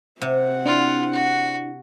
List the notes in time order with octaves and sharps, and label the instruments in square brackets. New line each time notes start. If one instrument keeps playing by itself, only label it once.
[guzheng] C3 [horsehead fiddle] C4 F#5
[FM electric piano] D4 E4 [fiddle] F4
[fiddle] F#4